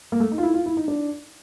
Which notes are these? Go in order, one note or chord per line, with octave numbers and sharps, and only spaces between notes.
A#3
A3
D#4
F4
E4
F4
E4
D#4
D4